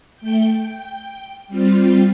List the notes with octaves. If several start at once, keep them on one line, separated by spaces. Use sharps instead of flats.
A3 G5 G6
G5
G3 C4 F4